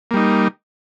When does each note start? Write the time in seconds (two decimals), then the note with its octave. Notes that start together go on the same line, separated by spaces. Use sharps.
0.11 A#3
0.14 G3
0.17 D#4